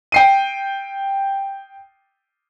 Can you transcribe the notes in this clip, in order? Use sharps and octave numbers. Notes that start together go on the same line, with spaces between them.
G5 C7 D#7